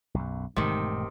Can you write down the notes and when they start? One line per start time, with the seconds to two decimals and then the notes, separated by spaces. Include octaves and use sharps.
0.14 B1 F#2
0.56 E1 G#2 C3 D#3 A3